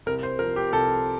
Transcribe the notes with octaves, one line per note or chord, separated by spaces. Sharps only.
C2 A#4
C5
F3 A#4
G4
C2 A4